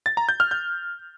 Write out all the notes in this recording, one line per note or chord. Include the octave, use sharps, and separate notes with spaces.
A6
A#5
G6
F6
G6